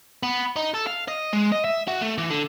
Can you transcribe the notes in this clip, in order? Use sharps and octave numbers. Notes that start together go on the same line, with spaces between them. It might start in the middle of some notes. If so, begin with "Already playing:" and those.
B3
D#4
A4
F5
D#5
G#3
D#5
E5
F#4
A3
E3
D3